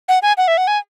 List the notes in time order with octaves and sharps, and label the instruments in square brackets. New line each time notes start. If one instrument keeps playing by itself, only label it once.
[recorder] F#5
G#5
F#5
E5
F#5
G#5